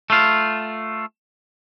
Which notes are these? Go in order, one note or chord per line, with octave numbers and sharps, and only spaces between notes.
A3 F4